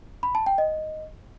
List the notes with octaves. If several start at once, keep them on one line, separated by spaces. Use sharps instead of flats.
B5
A5
G5
D#5